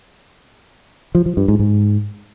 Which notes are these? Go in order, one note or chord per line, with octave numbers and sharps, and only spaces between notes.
F3
F3
G2
G#2
G#2